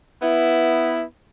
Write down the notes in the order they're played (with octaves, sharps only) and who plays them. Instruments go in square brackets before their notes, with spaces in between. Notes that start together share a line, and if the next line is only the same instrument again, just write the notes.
[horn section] B3 E4